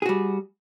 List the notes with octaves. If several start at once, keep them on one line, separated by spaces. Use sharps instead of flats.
G3 F#4 G#4